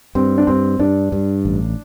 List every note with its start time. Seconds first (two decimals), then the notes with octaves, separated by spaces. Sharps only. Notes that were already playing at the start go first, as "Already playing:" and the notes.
0.15 G2 C4
0.38 D4
0.47 G2 C4
0.79 G2 D4
1.12 G2
1.45 A1